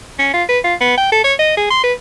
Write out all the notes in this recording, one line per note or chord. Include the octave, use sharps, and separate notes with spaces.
C#4
F4
B4
F4
B3
G5
A4
C#5
D#5
G#4
C6
B4